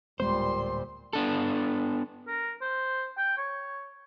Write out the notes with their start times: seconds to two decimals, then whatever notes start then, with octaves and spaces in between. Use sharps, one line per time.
0.20 D1 A#2 G3 G#3 B3 C5 C6
1.13 B3 D4 A4
2.27 A#4
2.61 C5
3.18 G5
3.37 C#5